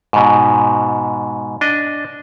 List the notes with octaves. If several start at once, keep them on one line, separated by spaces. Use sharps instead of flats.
G#2 B2
D4 D#5